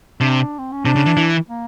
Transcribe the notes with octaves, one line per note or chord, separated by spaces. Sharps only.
C3 D4
C4
C#4
C3 D4
C#3
E3
E3
A#3